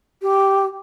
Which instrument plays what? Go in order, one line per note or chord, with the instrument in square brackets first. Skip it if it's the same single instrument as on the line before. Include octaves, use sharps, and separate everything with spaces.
[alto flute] G4